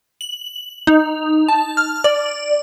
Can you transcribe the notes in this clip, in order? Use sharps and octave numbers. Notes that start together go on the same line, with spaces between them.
F#7
D#4
A5
F6
D5